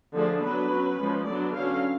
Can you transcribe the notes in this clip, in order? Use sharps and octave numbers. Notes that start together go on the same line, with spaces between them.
D3 F3 A3 D4 G#4
F#3 B3 D4 B4
F#3 C#4
F3 G#3 C#4
D3 F#3 B3 D4 D5
D3 F#3 C#4 F5